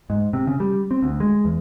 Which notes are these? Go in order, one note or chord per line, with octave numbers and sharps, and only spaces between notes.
G#2
C3
C#3
G3
C4
D2
G#3
E2